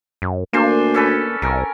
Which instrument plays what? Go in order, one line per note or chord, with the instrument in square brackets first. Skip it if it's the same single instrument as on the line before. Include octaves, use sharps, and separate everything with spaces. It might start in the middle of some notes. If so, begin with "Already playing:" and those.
[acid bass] F#2
[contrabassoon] D2 [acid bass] A#3 [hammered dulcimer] D4 C5 G#5
[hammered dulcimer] C#4 A4 B4
[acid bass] C2 [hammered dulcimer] A#4 G#5